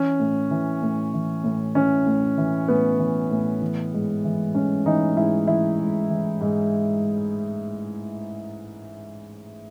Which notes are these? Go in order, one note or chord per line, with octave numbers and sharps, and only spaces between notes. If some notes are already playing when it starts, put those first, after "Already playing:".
Already playing: E3 C#4
A2
E3
A2
E3
A2
E3 C#4
A2
E3
A2 B3
E3
A2
E3
G#2
E3
G#2 C#4
E3 D#4
G#2 E4
E3 E4
G#2
E3
G#2